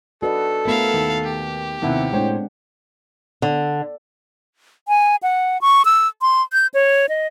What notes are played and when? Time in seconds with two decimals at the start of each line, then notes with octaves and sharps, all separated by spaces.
0.22 D4 F#4 A4 B4 D#5
0.66 A3 B3 E4 A#4 F5
0.94 D#2
1.24 G4
1.82 D#2 C3 B3 C4 E4 F#5
2.13 A2 G#3 C4 D4 C5 C#5 G5
3.42 D3
4.88 G#5
5.23 F#5
5.61 C#6
5.85 E6
6.22 C6
6.53 G6
6.74 C#5
7.09 D#5